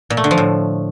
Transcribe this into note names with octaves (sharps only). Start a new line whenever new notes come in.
A#2
A3
D3
F3
A2